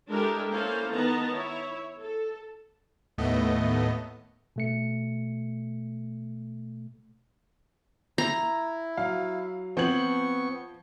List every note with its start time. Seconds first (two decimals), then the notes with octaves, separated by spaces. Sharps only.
0.10 G#3 D4 E4 G4 A4 A#4
0.51 A#3 C#4 E4 A4 C5 F5
0.94 D#3 B3 A5 A#5
1.32 E4 C#5
1.99 A4
3.18 D#2 A2 A3 B3 D#5
4.56 B2 A3 C#7
8.18 E4 A#5
8.97 F#3 F5
9.77 F3 B3 C4 C#6 G#6 F#7